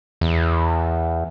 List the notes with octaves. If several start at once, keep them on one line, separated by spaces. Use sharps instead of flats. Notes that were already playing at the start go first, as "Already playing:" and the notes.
E2